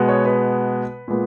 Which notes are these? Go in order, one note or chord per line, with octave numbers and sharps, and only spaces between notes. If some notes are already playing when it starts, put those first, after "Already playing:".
Already playing: B2 G#3 B3
C#5
B4
A#2 G#3 B3